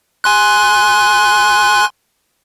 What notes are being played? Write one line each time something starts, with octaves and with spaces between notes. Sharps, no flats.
G#5 C6 F#6